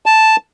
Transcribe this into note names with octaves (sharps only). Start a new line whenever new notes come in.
A5